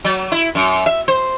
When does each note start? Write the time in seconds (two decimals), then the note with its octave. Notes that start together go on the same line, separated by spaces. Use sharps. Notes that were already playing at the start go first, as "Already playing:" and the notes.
0.05 F#3
0.32 E4
0.55 F#2
0.86 E5
1.08 C5